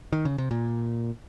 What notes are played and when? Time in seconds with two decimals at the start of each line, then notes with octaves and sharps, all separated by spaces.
0.13 D#3
0.25 C#3
0.38 C3
0.51 A#2